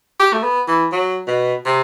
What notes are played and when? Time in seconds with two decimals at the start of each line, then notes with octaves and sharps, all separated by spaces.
0.20 G4
0.33 A3
0.43 B3
0.68 E3
0.92 F#3
1.28 B2
1.65 C3